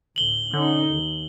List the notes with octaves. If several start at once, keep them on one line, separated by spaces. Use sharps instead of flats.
D2 A2 F#7 G7
D3 C#4 D#4
D#2